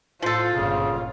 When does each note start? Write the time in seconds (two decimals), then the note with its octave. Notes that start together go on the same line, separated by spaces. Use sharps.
0.22 A2 F3 F4 A4 C5
0.53 G1 A#2 C#3